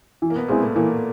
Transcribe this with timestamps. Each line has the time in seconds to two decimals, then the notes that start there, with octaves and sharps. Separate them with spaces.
0.22 E3
0.30 A#3
0.35 B2 B3
0.48 A#2 G#3 A#3 C4 E4 G#4
0.62 A2 A3
0.76 A#2 E3 A#3